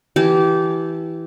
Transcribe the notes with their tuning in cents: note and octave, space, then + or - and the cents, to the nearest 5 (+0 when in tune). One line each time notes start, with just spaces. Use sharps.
E3 +0 G4 -20 A5 -30